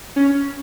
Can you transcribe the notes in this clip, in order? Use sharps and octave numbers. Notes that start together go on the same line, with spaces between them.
C#4